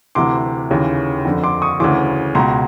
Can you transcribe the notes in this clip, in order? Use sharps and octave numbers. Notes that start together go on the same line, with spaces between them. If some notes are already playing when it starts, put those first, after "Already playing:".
D2 C3 E3 C6 D6
D#2 C#3 E3
F2 D3
C6 D6
C#6 D#6
D2 C#3 E3 C6 D6
C#2 B2 A#5 C6